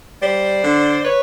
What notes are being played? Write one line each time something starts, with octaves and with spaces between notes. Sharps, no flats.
G3 C5 D5
D3
B4 C#5